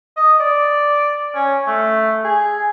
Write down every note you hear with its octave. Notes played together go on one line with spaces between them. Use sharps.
D#5
D5
C#4
A3
G#4